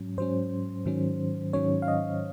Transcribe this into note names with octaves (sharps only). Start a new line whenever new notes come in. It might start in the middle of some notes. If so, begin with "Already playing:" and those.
Already playing: G#2 F#3 C#4
G#2 F#3 C#4 C5
G#2 D#3 F#3 C#4
G#2 D#3 F#3 C#4 C#5
F5
D#5